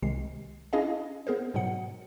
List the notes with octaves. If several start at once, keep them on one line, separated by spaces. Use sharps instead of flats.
C2 C3 D#3 G#3 C7
C#4 D4 E4 G#4 D#5 F5
B3 G#4 A#4 C5
G#2 B2 F#3 F#5 C#7